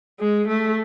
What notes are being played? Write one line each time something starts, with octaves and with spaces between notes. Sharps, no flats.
G#3
A3